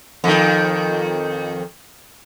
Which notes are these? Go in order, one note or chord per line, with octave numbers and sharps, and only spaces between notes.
F2 D#3